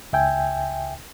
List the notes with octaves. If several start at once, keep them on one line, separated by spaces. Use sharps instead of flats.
C#2 E5 G5 G#5